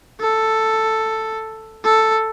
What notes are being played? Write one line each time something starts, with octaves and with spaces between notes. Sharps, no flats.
A4
A4